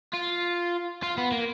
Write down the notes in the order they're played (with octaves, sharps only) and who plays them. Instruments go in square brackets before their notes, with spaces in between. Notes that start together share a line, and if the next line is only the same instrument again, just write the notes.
[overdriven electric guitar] F4
F4
B3
A#3